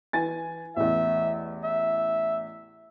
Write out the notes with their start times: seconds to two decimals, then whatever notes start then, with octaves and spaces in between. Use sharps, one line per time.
0.13 E3 G#5 A6
0.77 A1 E2 E5
1.64 E5